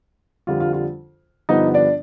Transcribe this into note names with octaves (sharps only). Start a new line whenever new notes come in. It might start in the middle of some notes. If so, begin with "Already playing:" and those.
F2 D3 G3 F4
F4
F4
G2 D3 F3 B3 D#4 D#5
D4 D5